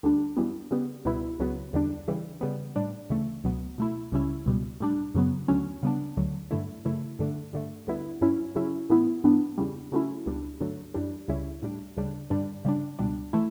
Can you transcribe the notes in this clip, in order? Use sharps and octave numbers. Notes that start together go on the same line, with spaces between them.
D2 D3 G3 D4
F#2 E3 G3 B3
C#3 G3 B3
C#2 B2 G3 B3 E4
C#2 C#3 F#3 B3
E2 D3 G3 D4
C#3 E3 G3
C#3 G3 B3
A2 G3 D4
D2 C#3 E3 A3
C#2 B2 F#3 B3
B2 A3 E4
C#2 C#3 G3 C#4 E4
C#2 B2 G3
A2 G3 D4
F#2 C#3 F#3 B3
D2 D3 F#3 C#4
C#3 G3 B3 D4
D2 D3 F#3
G2 D3 A3 E4
F#2 C#3 E3 A3 E4
G2 D3 A3 D4
G2 D3 A3
D2 D3 G3 B3 E4
G2 F#3 C#4 E4
C#3 F#3 C#4 E4
A2 E3 B3 E4
G2 E3 B3 D4
E2 C#3 G3
C#3 F#3 A3 C#4 E4
C#2 B2 G3 D4
G2 D3 F#3 A3
F#2 E3 G3 D4
C#2 C#3 G3 C#4 E4
A2 G3 D4
D2 C#3 G3 D4
G2 D3 G3 D4
C#3 G3 D4
C#2 B2 G3 D4
E3 A3 E4